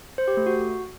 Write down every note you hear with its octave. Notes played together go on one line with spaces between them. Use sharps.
C5
G4
A3
F#4